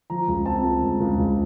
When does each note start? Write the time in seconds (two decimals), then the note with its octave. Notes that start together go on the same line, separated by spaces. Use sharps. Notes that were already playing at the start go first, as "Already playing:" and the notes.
0.10 F3 A#5
0.28 C#2
0.46 C4 A5
0.64 C#2
0.82 C#2
1.00 C#2
1.18 C#2